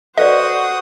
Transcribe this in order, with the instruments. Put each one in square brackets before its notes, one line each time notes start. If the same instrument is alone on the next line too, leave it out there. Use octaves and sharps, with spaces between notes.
[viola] F#4 C5 [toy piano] A4 B4 D5 [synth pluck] D#5 [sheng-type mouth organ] F#5 D#6